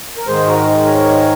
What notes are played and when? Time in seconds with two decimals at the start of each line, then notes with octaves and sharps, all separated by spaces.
0.17 A#4
0.27 G#2 D#3 G#3 G#4 C5
0.47 F#4 A#4
0.85 A#4 C#5